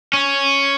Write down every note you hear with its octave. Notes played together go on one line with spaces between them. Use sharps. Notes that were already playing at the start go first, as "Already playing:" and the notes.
C#4